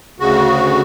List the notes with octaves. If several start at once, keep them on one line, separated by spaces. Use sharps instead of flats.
D2 C#3 F#4